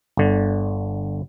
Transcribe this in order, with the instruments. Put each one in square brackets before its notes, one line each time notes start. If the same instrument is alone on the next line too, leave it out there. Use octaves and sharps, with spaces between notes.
[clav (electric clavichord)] G1 D3